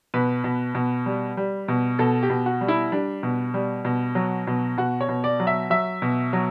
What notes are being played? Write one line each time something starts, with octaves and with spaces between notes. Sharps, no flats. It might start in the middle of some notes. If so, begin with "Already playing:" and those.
B2 B4
B2
B2
G3
G3
B2
B2 A4
G4
B2
F#4
G3
E4
G3 D4
B2
G3
B2
F#3
B2
B2 F#4
C#5
B2
D5
F#3
E5
F#3 E5
B2
F#3